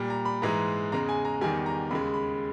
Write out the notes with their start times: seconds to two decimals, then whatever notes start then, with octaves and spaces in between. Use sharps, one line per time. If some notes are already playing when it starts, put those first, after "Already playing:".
Already playing: A#2 G3
0.10 A#5
0.25 B5
0.42 G#2 E3 G#3 A#5
0.92 E2 C#3 G#3 A#5
1.09 G#5
1.25 A#5
1.41 E2 D#3 G3 G#5
1.66 A#5
1.91 D#2 C#3 G#3 B5
2.14 B5